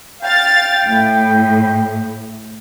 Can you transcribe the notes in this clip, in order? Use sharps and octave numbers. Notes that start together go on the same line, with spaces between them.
F5 G5 A6
A2